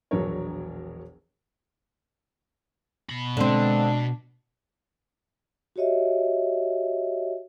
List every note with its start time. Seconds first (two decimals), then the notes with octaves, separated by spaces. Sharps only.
0.11 E1 A#1 F#3 D4 A#4 C#5
3.09 B2 B5
3.37 D3 G#3 C4 D4
5.76 F#4 G4 C#5 D#5 E5